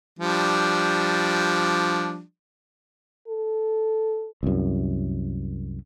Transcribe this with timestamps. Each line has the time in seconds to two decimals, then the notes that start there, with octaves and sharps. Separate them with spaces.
0.19 F3 G3 D4
3.28 A4
4.43 C2 F#2